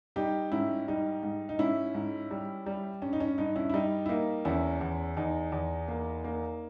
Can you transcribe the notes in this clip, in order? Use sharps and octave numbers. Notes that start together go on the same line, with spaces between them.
G3 D#4 G4
G#2 C#4 E4
G3 D#4
G#2
D#4
G#2 C#4 E4
G#2
G3
G3
G2 C#4
D#4
C#4
G2 D#4
C#4 E4
E4
G3 D#4
E4
A#3 D#4
E2 C#4 E4
E2
E2 D#4
E2
A#3
A#3